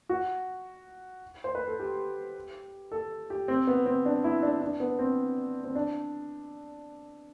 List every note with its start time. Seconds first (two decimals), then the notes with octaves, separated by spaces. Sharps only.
0.09 F#4
1.44 C5
1.55 B4
1.68 A4
1.80 G4
2.92 A4
3.30 G4
3.48 C4
3.67 B3
3.86 C4
4.06 D4
4.24 E4
4.43 D4
4.62 D4
4.80 B3
4.99 C4
5.64 C4
5.75 D4